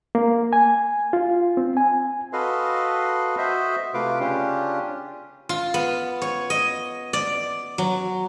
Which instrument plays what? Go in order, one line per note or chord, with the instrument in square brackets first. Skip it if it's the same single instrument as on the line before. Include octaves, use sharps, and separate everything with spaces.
[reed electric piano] A#3
G#5
F4
C4
G#5
[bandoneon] F#4 A4 B4 D#5 F5 C6
F#4 C5 D#5 E5
C3 A3 F4 B4 F5 D6
C#3 C#4 D4 F4 G4
[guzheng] F4
B3
C#5
D#5
D5
F#3